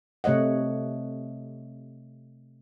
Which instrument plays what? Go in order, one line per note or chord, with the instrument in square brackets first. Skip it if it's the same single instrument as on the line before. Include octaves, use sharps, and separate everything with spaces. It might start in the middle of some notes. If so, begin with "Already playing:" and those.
[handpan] C3 A3 C#5 D#5 F#5